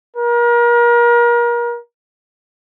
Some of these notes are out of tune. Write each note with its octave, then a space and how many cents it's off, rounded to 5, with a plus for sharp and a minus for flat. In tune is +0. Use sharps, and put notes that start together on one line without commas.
A#4 +35